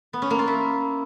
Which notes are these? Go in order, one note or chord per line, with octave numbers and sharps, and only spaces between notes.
B3
C#4
A#3
F4
E4